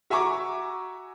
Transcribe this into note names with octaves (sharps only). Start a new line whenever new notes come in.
F#4 E5 G#5 A#5 C#6 D6